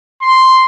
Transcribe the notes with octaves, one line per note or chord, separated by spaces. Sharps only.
C6